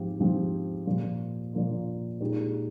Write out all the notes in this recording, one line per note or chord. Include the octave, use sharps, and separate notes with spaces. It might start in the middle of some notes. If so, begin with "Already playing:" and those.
Already playing: G#2 F3 C4 G4
G#2 F3 C4 G4
A#2 F3 A#3 F4
A#2 F3 A#3 F4
A#2 G#3 D#4 G4